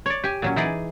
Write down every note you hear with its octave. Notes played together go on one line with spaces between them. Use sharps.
C#5 D5
G4 G#5
A#2 F#3 C#4
E3 D#4 G#4 D5